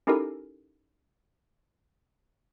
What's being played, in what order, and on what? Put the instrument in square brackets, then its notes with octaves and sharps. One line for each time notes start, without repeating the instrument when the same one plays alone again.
[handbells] C#4 D#4 E4 G4 A4 A#4